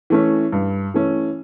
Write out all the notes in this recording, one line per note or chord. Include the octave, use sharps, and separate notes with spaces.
E3 A3 C#4
G2
E3 A3 C#4